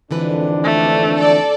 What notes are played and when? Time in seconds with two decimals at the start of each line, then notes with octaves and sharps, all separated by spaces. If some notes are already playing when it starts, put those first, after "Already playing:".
0.11 G#1 F2 D3 E3 D4 B4
0.64 A3
1.16 A4 D5